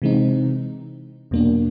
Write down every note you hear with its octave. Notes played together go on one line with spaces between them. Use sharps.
C3 E3 G#3 C4 D#4
E2 B2 F#3 A#3 D4